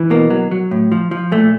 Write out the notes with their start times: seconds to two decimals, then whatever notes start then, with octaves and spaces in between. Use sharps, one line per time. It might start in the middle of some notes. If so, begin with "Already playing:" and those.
Already playing: E3
0.10 B2 A#3
0.30 F#3
0.51 F#3
0.71 A2
0.92 F3
1.11 F3
1.32 A#2 A3